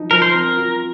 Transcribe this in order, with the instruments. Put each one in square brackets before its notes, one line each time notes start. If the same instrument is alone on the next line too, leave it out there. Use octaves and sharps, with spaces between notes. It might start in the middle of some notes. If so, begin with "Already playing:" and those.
Already playing: [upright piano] F3 D#4
[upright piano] F3 [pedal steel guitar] A#4
[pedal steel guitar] C5
[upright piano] C4 [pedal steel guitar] A#4
[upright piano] F4